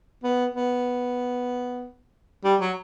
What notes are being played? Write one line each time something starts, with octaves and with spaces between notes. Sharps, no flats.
B3
B3
G3
F#3